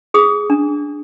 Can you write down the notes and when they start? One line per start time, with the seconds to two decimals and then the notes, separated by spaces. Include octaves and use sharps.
0.14 G#4 D#6
0.50 D4